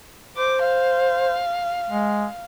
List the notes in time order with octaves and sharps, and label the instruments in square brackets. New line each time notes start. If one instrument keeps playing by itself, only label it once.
[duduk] C5 [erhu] D6
[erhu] F5
[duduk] G#3